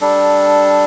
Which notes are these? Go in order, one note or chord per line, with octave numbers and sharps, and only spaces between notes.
G3 D4 A4